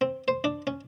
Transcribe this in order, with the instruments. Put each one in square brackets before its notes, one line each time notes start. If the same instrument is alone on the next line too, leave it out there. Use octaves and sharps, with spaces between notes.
[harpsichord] C4
C5
D4
C#4